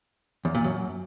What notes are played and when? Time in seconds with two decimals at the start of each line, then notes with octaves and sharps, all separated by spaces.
0.45 E2
0.55 A#2
0.64 F#2